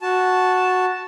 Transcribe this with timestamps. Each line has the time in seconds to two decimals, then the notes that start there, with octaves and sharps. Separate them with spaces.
0.01 F#4 A5